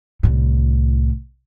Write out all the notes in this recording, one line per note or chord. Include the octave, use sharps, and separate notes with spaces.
C2 A2